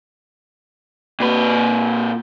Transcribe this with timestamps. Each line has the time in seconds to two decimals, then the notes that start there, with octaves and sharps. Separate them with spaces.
1.20 A#2 B4